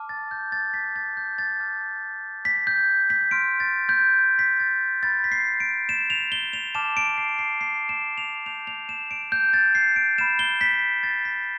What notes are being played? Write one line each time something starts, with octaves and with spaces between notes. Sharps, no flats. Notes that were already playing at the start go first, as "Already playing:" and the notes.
Already playing: A5 D6 F6
A6
G6
A6
B6
A6
G6
A6
A5 D6 F6
B6
G6
B6
C6 F6 D7
A6
G6
B6
A6
B5 F6 A6
B6
C7
D7
E7
F7
G7
F7
A5 D6 F6 E7
D7
C7
C7
C7
E7
F7
A5 D6 G6 F7
F7
E7
D7
G6
A6
C7
D7
B5 F6 E7
G7
B6
A6
B6